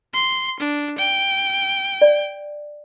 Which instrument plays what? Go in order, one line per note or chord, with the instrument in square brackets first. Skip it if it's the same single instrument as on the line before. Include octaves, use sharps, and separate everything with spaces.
[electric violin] C6
D4
G5
[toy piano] D5